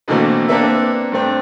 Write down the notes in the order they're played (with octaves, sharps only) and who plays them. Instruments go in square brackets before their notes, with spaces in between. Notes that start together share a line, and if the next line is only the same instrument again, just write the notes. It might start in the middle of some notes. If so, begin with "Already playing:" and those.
[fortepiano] B2 D3 E3 A3 A#3 C4
A#3 C4 D4 A4 B4 E5
G2 A3 C4 D4